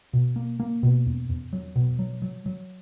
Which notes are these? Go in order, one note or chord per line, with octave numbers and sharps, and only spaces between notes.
B2
A#3
A#3
B2
E2
E2
F#3
B2
F#3
F#3
F#3